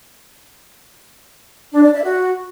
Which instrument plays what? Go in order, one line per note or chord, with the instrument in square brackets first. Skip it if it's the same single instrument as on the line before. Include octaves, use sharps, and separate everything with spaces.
[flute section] D4
D5
E5
F#4